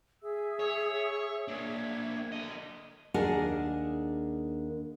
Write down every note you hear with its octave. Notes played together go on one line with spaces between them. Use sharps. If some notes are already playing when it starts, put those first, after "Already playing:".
G#4 E5 E6
C#5
A#3 D4 E5 G#6
D3 D#5
D#2 D4 G#4 A#4 F#5 G#5